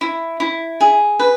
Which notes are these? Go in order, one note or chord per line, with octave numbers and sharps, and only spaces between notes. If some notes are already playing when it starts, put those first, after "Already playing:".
E4
E4
G#4
B4